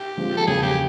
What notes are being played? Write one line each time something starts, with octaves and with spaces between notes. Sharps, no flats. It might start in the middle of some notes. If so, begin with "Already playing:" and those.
Already playing: G4
D3 F3 G#3 C4
A4
E2 C#3 F#3 A#3 G#4
G4